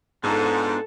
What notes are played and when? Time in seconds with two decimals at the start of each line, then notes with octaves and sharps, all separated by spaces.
0.24 G#2 B3 D4 F4 A4 A5